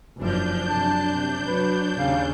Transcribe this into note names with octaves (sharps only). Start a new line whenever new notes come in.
F#1 F3 D4 G6
F#2 C3 A5
C3
F#3 B4
D#2 C#3 F5